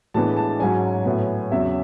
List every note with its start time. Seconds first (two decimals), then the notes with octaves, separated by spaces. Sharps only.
0.14 A2 E3 G#3 B3 D4 A5
0.37 A5
0.49 A5
0.60 G#2 F#3 C#4 G#5
1.05 A2 F#3 B3
1.52 E2 C#3 F#3 E5